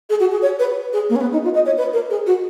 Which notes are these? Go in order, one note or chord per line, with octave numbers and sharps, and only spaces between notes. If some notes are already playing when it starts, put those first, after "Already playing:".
G#4
F#4
G#4
C#5
B4
G#4
A#3
C#4
B3
D#4
F4
D#5
C#5
B4
A#4
G#4
F#4